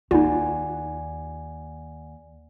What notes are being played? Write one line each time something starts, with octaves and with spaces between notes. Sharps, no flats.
D#2 D#4 F4 D5 F#5 G#5